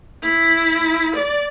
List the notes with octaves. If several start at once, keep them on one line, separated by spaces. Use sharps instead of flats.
E4
D5